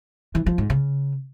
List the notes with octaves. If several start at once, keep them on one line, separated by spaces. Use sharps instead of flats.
E3
F3
G#2
C#3